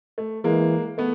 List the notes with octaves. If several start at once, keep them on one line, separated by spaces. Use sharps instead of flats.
A3
E3 G#3 A#3
A3 B3